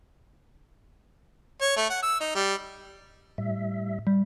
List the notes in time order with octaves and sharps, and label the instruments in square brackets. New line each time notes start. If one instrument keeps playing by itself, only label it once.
[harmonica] C#5
A3
F#5
E6
D#4
G3
[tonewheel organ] A2 G3 E5
[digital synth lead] G3